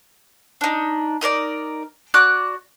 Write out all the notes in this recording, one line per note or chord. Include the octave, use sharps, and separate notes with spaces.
D4 D#4
D#4 A#4 C5 D5
F#4 D5 D6 F#6